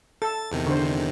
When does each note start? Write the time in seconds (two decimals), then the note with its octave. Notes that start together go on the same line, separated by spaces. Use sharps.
0.22 A4 A6
0.52 E2 C3 D#3
0.66 D3 C5